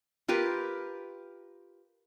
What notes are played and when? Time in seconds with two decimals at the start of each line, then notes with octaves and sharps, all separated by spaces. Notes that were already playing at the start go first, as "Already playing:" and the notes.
0.28 F4 G4 A#4 B4